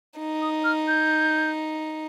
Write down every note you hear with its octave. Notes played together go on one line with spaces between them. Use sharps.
D#4
D#6
F6
G6